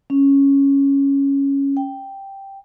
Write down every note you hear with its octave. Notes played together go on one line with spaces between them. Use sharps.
C#4
G5